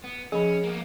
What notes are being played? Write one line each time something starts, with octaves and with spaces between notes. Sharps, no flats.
B3
F3 C#4 G#4 B5
A#3 B3